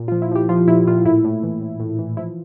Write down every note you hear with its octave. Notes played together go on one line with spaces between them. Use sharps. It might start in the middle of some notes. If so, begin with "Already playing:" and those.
Already playing: A#2
F4
F3
E4
F3 G4
F3 F4
A#2 E4
A#2 F4
A2 E4
A2
E3
A2
A2
E3
F3 E4